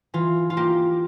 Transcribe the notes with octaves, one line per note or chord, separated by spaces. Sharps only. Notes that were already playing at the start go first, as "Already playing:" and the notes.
E3 F4
F4
A#3 G4